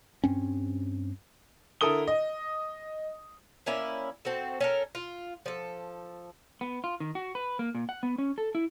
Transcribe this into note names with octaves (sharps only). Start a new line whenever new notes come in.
G2 C4 C#4
D3 E4 A4 A#4 D#6 G7
D#5
A#3 C#4 E4 D5
C4 F#4 A4
C#4 A4 A#4
F4
F3 A4
B3
F4
D#3
F#4
B4
A#3
A#2
F#5
B3
C#4
A4
E4